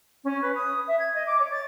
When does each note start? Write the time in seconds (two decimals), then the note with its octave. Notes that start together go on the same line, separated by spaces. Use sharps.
0.24 C#4
0.41 B4
0.55 D#6
0.87 E5
0.99 G#6
1.14 D#5
1.26 D6
1.39 C#5
1.51 A6